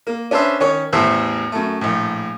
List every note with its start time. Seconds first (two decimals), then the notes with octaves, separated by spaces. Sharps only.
0.07 A#3
0.31 C#4 D4 B4 C5 E5
0.60 D#3 C#4 C#5 C#6
0.93 A1 E2 A2 C5 E5
1.52 F#2 A3
1.81 A#1 A2